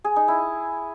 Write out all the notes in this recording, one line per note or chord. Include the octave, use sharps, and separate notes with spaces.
G#4
D#4
E4